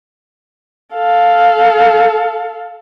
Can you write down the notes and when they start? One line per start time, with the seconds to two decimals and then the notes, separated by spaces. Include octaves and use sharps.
0.95 A4 F5